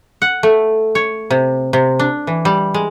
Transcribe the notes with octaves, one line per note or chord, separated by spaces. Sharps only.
F#5
A3
C#5
C3
C3
D4
E3
G3
G#3